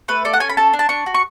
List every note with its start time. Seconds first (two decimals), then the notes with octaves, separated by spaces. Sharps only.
0.08 A3 B4
0.25 A4 D5
0.33 F#5
0.40 C#4 G#5
0.49 B5
0.57 A4 A5
0.73 D4
0.79 A5
0.89 D4 C#6
1.06 F#4
1.14 C#6